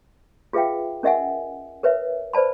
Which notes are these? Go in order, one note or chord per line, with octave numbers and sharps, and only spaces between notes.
F4 G#4 B4 E5 F5 G5
C#4 A#4 D#5 E5 F#5 G#5
A#4 B4 C#5 E5
B4 C5 D5 A5 B5